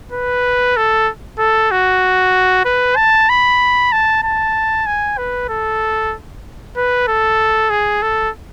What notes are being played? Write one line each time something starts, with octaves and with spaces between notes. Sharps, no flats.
B4
A4
A4
F#4
B4
A5
B5
A5
A5
G#5
B4
A4
B4
A4
G#4
A4